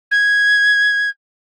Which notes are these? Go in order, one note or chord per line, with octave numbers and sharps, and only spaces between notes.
G#6